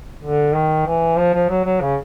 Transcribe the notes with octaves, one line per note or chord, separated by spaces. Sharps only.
D3
D#3
E3
F3
F3
F#3
F#3
C#3